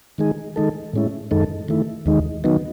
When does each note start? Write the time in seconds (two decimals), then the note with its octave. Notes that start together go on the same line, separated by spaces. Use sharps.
0.18 D#3 G#3 D#4 G#4
0.56 D#3 G#3 D#4 A4
0.93 A2 G#3 C#4 E4
1.31 F#2 D#3 G#3 D#4 A4
1.68 D#3 A3 E4
2.06 D#2 D#3 G#3 D#4
2.44 D#3 F#3 B3 D#4